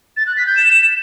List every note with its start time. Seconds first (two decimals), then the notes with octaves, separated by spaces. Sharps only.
0.17 A6
0.27 F#6
0.37 B6
0.47 G6
0.57 E7